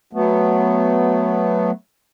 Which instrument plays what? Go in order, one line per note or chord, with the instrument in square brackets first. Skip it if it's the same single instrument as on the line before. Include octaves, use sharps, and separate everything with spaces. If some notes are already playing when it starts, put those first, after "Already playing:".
[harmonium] F#3 A3 B3